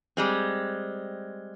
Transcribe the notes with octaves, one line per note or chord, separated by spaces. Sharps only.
G3 G#3 C4